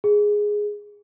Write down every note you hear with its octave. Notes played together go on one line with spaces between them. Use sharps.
G#4